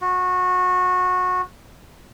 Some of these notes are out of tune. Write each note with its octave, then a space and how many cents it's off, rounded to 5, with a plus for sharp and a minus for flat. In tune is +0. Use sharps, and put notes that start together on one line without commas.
F#4 -20